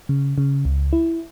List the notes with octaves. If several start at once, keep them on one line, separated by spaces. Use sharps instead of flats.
C#3
C#3
C#2
E4